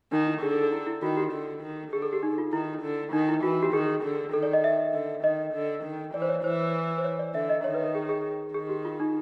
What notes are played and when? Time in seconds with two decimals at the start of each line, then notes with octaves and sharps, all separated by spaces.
0.12 D#3 D#4
0.27 E4
0.42 D3 G#4
0.52 A4
0.62 A4
0.72 E4
0.87 E4
1.02 D#3 F#4
1.17 G4
1.32 D3
1.63 D#3
1.92 D3 G#4
2.02 A4
2.13 G4
2.23 D#4
2.38 F4
2.53 D#3 E4
2.82 D3
3.13 D#3 D#4
3.29 E4
3.43 E3 F#4
3.63 G4
3.73 D#3 G#4
4.04 D3
4.33 D#3 A4
4.43 D5
4.53 D#5
4.64 E5
4.94 D3
5.24 D#3 D#5
5.54 D3
5.84 D#3
6.14 E3 D5
6.22 C5
6.29 C#5
6.44 E3 C5
6.98 C5
7.04 C#5
7.19 D5
7.34 D3 E5
7.49 D#5
7.64 D#3 C#5
7.74 B4
7.84 A#4
7.95 G#4
8.09 G#4
8.54 D#3 G#4
8.69 G4
8.85 F4
9.00 D#4